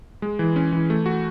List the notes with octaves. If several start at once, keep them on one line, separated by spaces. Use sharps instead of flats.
G#3
E3
C#4
E3
A3
F#4